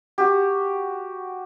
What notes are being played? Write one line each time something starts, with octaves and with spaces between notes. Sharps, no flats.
F#4 G4